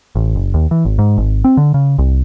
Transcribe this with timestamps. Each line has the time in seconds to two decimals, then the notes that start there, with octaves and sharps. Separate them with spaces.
0.15 A1
0.36 F#1
0.54 D#2
0.71 E3
0.85 G#1
0.99 G#2
1.17 G#1
1.44 C4
1.57 D3
1.74 C#3
1.98 C2